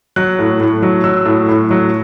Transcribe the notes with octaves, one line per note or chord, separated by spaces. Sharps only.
F#3 F#6
A2
A2
F#3
F#3 E6
A2
A2
F#3